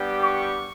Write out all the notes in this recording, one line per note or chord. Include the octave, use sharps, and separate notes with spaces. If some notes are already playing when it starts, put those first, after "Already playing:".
Already playing: G3 B3 D4 G4
C#6